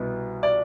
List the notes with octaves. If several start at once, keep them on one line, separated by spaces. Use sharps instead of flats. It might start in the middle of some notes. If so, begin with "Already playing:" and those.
Already playing: C2 B2 B3
D5